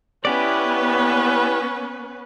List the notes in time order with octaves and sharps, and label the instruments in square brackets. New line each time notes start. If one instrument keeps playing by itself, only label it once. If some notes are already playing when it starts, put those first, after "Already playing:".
[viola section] B3 C#4 B4 [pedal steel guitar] E4 G4 D5